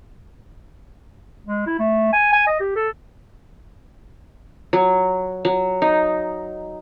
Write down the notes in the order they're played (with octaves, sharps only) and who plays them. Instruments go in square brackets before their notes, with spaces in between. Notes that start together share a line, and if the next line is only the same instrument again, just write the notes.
[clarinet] G#3
E4
A3
G#5
G#5
D#5
G4
A4
[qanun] F#3
F#3
D#4